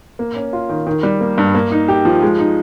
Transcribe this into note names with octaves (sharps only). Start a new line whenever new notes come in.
A#3
C#4
F4
D#3
D#3
G3
A#3
G2
A#3
D#4
G4
F3
G#3
D#4